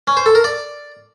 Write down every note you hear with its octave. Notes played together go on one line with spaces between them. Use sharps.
C#4
C5
A4
A#4
D5